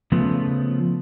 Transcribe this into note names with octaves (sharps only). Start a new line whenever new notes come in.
C#3 F3 A3 B3